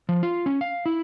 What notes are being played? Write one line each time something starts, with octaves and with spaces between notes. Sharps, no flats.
F3
F4
C#4
F5
E4